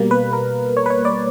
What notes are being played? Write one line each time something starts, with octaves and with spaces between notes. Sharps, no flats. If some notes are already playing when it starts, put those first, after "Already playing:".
Already playing: B2 G3 A#3
B4
A#4
C#5
B4
C#5
D5